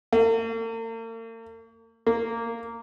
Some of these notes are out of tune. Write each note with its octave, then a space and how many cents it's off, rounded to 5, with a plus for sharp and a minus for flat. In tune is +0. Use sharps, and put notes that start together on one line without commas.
A#3 -45
A#3 -15